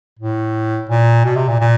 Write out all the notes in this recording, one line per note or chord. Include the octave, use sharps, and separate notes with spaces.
A2
A#2
B2
C3
A#2
A#2